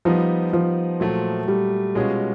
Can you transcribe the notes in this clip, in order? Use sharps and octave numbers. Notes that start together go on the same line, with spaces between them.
F3 G3 B3 D#4
F3
A#2 F#3 A3
G3
B2 G#3 C#4 F4 G#4